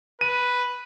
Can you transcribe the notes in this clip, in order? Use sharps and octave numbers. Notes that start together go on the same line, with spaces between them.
B4 D#7